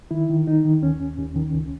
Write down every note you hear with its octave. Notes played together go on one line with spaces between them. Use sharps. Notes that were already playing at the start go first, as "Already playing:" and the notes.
D#3 E4
D#3
D#3 D#4
D#3
D#2 C#4
D#2
D#2
D#3
C#2